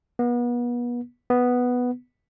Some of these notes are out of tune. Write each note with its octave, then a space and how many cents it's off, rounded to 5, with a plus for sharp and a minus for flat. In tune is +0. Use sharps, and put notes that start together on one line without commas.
B3 -35
B3 +0